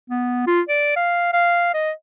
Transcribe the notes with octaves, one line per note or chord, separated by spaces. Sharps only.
B3
F4
D5
F5
F5
D#5